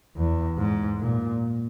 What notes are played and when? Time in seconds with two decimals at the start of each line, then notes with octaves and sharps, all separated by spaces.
0.17 E2
0.58 G#2
1.00 A#2